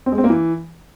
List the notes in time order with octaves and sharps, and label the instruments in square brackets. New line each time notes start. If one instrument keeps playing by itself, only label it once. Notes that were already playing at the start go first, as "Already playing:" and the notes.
[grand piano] C4
G#3
C4
A#3
E3